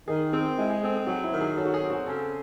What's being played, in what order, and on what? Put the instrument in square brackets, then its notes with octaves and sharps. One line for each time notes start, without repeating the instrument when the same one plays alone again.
[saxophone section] D#3 [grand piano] G#4
[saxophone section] C4 [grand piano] G#4
[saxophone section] G#3 [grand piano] E4
[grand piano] G#4
[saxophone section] C4 [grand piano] A4
[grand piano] G#4
[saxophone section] F#3 [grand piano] F#4
[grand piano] E4
[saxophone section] D#3
[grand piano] G#4
[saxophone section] F#3 [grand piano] A4
[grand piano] F#4
G#4
[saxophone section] C4
[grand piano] F#4
[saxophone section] C#3 [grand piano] A4